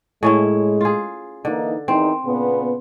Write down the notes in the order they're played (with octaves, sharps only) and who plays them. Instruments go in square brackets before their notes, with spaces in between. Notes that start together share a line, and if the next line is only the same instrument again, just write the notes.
[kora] A2 C#4 E4 [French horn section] G#3
[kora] F4 G#4
[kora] D3 [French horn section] E3 A#3 D#4
[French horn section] E2 D#3 [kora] C4
[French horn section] A#2 C#3 B3